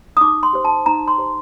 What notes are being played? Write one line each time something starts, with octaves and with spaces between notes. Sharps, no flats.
D#6
D#4 D6
C6
G4 C5
A5
D#4 A#5
C6
G4 C5